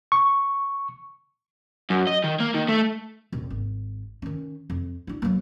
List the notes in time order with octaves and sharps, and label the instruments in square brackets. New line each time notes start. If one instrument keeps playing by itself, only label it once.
[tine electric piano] C#6
[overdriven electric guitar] F#2
D#5
D#3
A#3
D#3
A3
[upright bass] D#1
G#1
D#3 C#4
F2
D4 E4
F#3 A#3